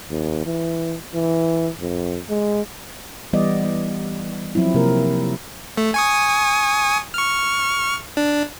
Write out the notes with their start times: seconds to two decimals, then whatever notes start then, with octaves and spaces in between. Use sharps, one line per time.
0.10 D#2
0.46 E3
1.14 E3
1.80 F2
2.29 G#3
3.33 E3 G3 B3 D5 D#5
3.64 B3
4.55 F3 F#3 C4 E4
4.74 C3 A#3 A#4
5.77 A3
5.94 G#5 C#6 D#6
7.14 C#6 F6
8.17 D4